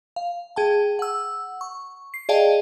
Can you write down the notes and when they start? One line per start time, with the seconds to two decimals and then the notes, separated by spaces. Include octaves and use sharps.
0.16 F5
0.56 G#4 G5 A5
0.99 F#5 E6
1.61 C#6
2.14 C7
2.29 G#4 D5 D#5 F5 G5 A5